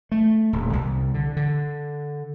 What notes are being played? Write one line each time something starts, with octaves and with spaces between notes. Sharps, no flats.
A3
D#1
C2
D3
D3